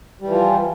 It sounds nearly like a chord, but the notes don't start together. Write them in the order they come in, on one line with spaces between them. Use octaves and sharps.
G3 E3 F3